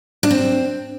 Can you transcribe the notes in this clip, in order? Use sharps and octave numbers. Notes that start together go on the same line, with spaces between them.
D4
C4